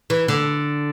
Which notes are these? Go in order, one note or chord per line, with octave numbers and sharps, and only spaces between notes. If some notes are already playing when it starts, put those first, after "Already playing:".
E3
D3